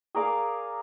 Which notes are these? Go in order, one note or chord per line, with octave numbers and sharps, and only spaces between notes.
G#4 A#4 D5 F5